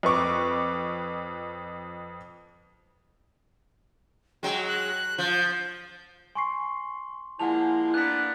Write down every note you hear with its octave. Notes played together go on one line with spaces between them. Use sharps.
F2 B4 C#6 D6
F#3 G#3 G5
F#6
F3 G6
G#5 C6 C#6 C7
F3 G#3 A#3 E4 F#5 G#5 A5 F7
A#3 B3 D4 F#6 B6